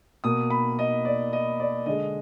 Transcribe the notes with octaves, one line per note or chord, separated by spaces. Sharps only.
B2 A#3 D#6
B5
D#5
D5
D#5
D5
D3 G#3 D#5